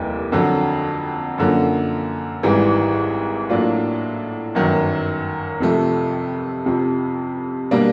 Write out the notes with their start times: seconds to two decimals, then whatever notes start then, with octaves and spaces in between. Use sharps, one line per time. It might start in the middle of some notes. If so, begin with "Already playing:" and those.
Already playing: F1 D#2 E3 G3
0.32 F2 D3 F#3
1.38 F#2 D3 F3 A#3 C#4
2.43 G#1 G#2 E3 G3
3.49 A2 F#3 A#3 D4 F4
4.55 G1 F#2 D#3 F#3
5.60 F2 C3 F3 A3
6.66 F2 C3 F3
7.71 B2 G3 A#3 D4